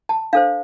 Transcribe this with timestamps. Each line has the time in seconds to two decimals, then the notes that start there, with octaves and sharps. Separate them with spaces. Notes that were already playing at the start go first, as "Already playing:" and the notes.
0.09 A5
0.33 D4 A4 C5 F5